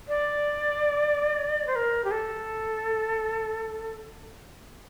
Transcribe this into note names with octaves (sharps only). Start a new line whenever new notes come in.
D5
C5
A#4
G4
A4